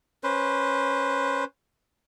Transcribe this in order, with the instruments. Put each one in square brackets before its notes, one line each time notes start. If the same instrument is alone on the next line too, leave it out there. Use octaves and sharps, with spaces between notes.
[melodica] C#4 B4 C5